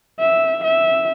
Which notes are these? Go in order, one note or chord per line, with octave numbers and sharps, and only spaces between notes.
E5
E5